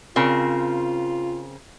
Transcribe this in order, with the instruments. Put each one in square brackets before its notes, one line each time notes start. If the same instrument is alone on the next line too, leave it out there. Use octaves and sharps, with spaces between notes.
[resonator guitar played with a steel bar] C#3 C4 A#4 [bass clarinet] F4